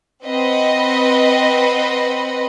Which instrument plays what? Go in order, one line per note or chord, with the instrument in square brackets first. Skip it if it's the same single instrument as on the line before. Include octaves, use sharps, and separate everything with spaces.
[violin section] C4 B4 D#5 F#5 B5